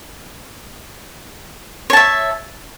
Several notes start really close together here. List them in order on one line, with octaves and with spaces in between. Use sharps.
C#5 A5 E5